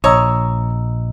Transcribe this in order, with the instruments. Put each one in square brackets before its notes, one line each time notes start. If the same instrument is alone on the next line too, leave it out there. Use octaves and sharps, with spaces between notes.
[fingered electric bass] A#1 [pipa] C#5 [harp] D#5 A#5 E6